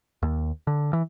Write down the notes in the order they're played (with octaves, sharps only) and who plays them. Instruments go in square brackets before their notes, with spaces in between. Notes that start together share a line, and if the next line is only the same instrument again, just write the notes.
[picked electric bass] D#2
D3
E3